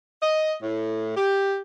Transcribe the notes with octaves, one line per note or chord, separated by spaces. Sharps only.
D#5
A2
G4